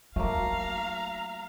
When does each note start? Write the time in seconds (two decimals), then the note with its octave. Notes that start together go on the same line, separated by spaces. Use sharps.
0.16 F#3 A3 A#3 D#4 F5 A#5